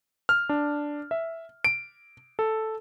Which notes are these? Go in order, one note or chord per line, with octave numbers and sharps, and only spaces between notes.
F6
D4
E5
D7
A4